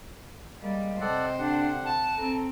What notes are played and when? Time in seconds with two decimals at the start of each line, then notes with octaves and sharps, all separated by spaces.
0.62 G3 G#3 A#3
1.01 C3 A4 C5 D5 D#5 F#5 G5
1.39 D3 D4 G4 F#5 G5
1.85 A5
2.18 C4 A4 A#5